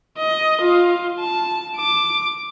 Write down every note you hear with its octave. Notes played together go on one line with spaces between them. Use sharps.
D#5
F4
A5
D6